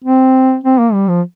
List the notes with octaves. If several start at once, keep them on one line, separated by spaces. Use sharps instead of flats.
C4
C4
A#3
G3
F3